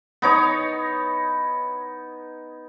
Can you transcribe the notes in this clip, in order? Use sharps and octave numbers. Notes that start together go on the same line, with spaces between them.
B3 D#4 C#5